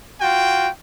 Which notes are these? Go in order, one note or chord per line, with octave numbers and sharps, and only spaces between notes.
F4 F#4 G5